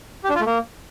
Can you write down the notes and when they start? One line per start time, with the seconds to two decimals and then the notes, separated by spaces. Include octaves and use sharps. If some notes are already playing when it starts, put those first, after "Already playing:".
0.24 G4
0.29 D4
0.35 F4
0.41 A3
0.46 A#3